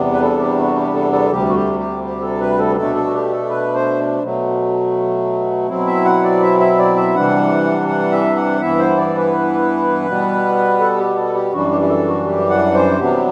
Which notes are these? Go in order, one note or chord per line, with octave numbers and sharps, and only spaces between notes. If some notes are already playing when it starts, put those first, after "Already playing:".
Already playing: E2 C3 G3 B3 D4
B4
A4
G4
F#4
G4
A4
A4
D2 C3 G3 G4
F#4
G4
G4
G4
A4
B4
A4
B2 A3 D4 A4
A4
F#4
G4
A4
B4
C5
B2 F#3 A3
B2 F#3 C4 E4
E5
F#5
D5
E5
E5
D5
E5
C3 E3 G3 D4 F#5
F#5
E5
F#5
G2 E3 B3 E4 E5
C5
D5
B4
B2 G3 B3
A4
G4
A4
G4
F#2 E3 G3 D4 F#4
G4
G4
A4
F#4
G4
F#5
C5
C3 F#3 B3 D4 G4